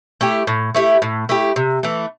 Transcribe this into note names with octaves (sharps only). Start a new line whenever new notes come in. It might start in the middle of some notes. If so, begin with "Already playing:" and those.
A3 E4 G4
A2
A3 E4 G4
A2
A3 E4 G4
C3
E3 A3